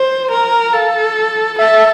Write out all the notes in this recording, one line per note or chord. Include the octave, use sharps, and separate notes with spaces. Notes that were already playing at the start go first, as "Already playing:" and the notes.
Already playing: C5
A#4
A4 F5
A4 E5